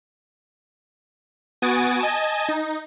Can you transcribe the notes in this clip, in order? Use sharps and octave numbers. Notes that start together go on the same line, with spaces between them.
B3 F#4 G#5 D#6 A6 D7
D#5 G#5 A5
D#4